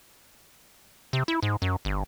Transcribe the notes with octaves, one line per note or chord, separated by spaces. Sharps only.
C3
E4
G#2
F#2
G1